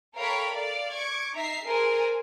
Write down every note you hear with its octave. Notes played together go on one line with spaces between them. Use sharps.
A4 A#4 C#5 F5 G5 B5
D5 F5
C#6 D6 G#6
D#4 E5 A#5 B6 C7
G#4 A#4 C5 G#5 A5